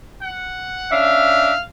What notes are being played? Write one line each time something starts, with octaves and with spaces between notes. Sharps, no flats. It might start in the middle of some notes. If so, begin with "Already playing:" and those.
F#5
C#4 D4 E5 F5